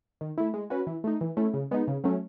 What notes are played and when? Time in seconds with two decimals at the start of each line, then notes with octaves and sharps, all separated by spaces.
0.21 D#3
0.38 A3 E4
0.54 G#3
0.70 C#4 F#4 B4
0.87 E3
1.04 A3 D#4
1.21 E3
1.37 A3 C#4 E4
1.54 C#3
1.71 G#3 B3 D#4
1.88 C#3
2.04 F#3 A3 C#4